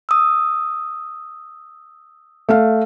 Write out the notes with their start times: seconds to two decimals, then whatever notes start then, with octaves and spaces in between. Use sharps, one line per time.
0.09 D#6 E6
2.49 A3 F5